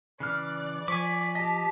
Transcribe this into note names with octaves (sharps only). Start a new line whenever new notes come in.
C#3 E3 D5 F6 F#6
F3 G#5 C#6 D6 B6
G4 D#5 A5